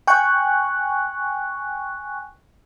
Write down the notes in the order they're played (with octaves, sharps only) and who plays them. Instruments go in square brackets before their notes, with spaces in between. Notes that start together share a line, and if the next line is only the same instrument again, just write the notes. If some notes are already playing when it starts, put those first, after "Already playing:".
[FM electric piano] G5 G#5 C#6 F#6